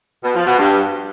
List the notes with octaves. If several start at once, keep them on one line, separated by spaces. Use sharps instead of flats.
B2
F3
B2
G2